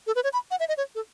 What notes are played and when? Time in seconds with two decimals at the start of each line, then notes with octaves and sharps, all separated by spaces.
0.07 A4
0.15 B4
0.24 C#5
0.33 B5
0.51 F#5
0.60 E5
0.69 D#5
0.77 C#5
0.95 A4